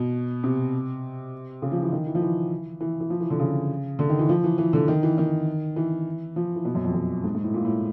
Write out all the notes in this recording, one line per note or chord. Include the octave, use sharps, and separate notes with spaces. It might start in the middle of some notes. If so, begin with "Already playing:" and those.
Already playing: B2
C3
C#3
F3
E3
D#3
E3
F3
E3
E3
E3
F3
E3
D3
C#3
D3
D#3
E3
F3
E3
E3
D3
D#3
E3
D#3
E3
F3
E3
B2
F#2
F2
F#2
G#2
G#2
A2
A#2
A2